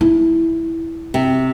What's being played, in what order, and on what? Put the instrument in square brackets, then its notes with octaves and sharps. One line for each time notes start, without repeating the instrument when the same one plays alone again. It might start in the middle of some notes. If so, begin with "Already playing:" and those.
[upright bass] E4
[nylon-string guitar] C3